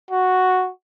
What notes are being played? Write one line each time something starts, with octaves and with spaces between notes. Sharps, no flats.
F#4